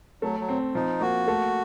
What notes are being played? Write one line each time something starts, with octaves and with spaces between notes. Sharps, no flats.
F#3 A3
F#3
C4
F3 D#4
A#3 F#4
A3